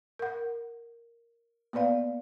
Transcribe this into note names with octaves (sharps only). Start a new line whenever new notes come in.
A#4 F#5
A#3 B3 B4 D5 F5